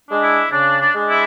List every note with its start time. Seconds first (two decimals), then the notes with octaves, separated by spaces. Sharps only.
0.08 G#3 D4
0.22 E4
0.51 C#3 D4
0.80 D4
0.95 G#3 D4
1.10 E4